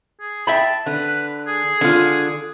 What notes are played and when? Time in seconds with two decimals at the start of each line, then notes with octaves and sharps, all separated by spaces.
0.21 G#4
0.47 E5 G5 A5 B5
0.86 D3 B4
1.47 G#4
1.81 D3 F4